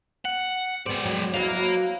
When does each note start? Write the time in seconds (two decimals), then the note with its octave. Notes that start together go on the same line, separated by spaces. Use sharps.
0.25 F#5
0.86 G#3 B3 C4 D5
1.05 F#3
1.34 F#3 B3 E4 A#4 F5